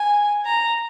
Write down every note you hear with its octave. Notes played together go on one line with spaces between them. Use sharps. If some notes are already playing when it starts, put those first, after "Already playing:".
Already playing: G#5
A#5